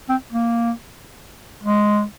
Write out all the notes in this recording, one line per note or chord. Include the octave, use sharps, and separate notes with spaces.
C4
A#3
G#3